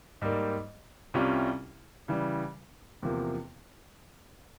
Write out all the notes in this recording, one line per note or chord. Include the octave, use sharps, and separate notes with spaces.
G#2 G3 A#3
C2 C3 G3 C#4 F4
C#3 E3 G3
E2 C3 F3 A#3